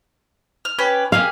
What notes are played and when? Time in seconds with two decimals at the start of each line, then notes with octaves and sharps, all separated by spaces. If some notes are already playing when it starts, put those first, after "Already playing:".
0.65 F6
0.79 C#4 G4 B4
1.12 A#3 G4 G#4 F5